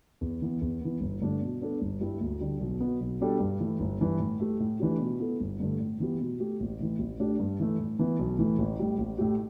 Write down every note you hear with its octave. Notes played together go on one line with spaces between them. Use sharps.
E2
E3 B3
E2
E3 B3
G1
G2 D3 A3 D4
B2
B3 D4 A4
G1
G2 G3 E4
D2
D3 G3
B1
B2 B3
B1
B2 G3 D4 A4
G2
E3 A3 E4
G1
G2 E3
A2
A3 G4
A2
E3 A3 D4 G4
B2
B3 E4 A4
G1
G2 D3 A3
A2
E3 B3 G4
B2
A3 G4
A1
A2 E3
A1
A2 A3 D4 G4
G2
E3 A3
A2
E3 B3 E4
B1
A2 E3 A3
A1
A2 G3
A1
A2 A3 G4